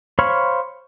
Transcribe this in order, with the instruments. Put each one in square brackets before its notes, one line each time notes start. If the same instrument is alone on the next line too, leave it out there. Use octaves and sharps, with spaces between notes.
[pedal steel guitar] C5 C#5 F5 B5 C#6